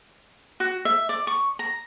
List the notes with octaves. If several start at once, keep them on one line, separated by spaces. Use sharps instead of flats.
F#4
E5
D5
C#6
A#5